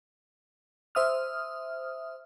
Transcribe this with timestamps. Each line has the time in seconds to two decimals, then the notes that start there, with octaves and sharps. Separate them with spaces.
0.95 C5 E5 D#6 F6